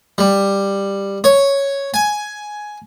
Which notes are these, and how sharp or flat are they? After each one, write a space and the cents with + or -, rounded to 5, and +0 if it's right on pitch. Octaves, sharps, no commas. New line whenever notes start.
G3 +10
C#5 +0
G#5 +10